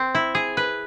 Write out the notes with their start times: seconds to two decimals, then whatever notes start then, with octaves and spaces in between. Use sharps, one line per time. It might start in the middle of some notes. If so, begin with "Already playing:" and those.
Already playing: C4
0.15 E4
0.35 G#4
0.57 B4